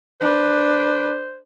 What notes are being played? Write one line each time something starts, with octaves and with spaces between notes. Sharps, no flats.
D4 B4 C5